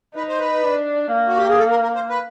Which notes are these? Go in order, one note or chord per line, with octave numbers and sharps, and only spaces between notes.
D#4 B4
C5
B4
D4
A#3
F#4
G4
G#4
A4
A#4
A#4
C5
B4